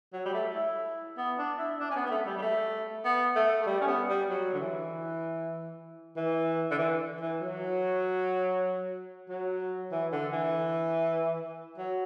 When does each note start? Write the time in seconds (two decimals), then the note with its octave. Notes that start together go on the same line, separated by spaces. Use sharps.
0.13 F#3
0.26 G3
0.34 A3
0.55 E4
1.18 B3
1.39 D4
1.59 E4
1.80 D4
1.91 C#4
1.96 B3
2.06 B3
2.11 A3
2.26 G3
2.37 G3
2.42 A3
3.05 B3
3.36 A3
3.63 A3
3.67 G3
3.81 C#4
3.88 B3
4.09 G3
4.30 F#3
4.54 D3
4.60 E3
6.17 E3
6.71 D3
6.79 E3
7.21 E3
7.41 F#3
9.30 F#3
9.92 E3
10.12 D3
10.33 E3
11.78 F#3